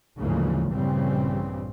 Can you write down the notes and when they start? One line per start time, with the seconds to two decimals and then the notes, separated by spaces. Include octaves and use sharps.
0.19 D2 G#2 C#3 E3 F3 A#3
0.72 A#1 G2 C#3 E3 G3 C4